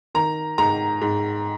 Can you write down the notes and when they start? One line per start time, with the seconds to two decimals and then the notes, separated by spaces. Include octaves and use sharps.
0.15 D#3 A#5
0.58 G#2 A#5
1.01 G#2